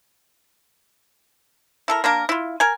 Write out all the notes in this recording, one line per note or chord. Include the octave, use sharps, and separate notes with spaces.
E4 A4 A#4
A#3 D4 A#4
E4 F4
A#4 G#5